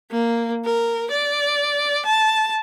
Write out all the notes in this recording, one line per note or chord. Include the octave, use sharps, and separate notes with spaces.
A#3
A#4
D5
A5